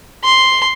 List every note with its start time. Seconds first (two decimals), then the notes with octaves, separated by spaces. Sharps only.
0.24 C6